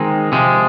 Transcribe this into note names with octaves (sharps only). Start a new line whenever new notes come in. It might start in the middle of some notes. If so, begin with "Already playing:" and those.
Already playing: D#3 G#3 C4 D#4
C3 F3 G#3